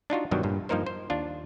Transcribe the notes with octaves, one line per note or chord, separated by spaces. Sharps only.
D4 D#4 F4 F#4
G2 B2 D#3 F#3 G3
G2 A#2
G2 F3 A#3 D#4 A#4 C5
C5
D#2 D4 F4